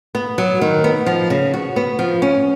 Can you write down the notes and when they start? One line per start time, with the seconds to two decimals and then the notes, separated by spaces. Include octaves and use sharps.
0.15 B3
0.38 F#3
0.61 D#3
0.84 B3
1.06 F3
1.30 C#3
1.54 F#4
1.76 B3
1.99 F3
2.22 C#4